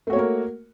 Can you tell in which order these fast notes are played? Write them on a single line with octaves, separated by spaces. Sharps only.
A3 F#4 C#5 A#3 A#4